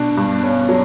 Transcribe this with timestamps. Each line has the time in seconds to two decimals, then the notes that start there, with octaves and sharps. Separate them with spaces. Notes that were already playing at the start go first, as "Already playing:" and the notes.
Already playing: B2 D4
0.17 G2
0.43 C#4
0.69 F#3